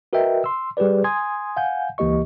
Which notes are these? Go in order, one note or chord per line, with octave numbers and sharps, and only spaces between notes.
F#4 A#4 B4 D#5 E5 G5
C6 E6
G3 G4 G#4 B4 D5
G#5 C6 D#6 G#6
F5 F#5 G#5 G6
C#2 E3 A#3 G4 D#5 C#6